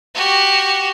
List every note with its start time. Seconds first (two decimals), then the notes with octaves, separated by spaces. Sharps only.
0.15 F#4 G4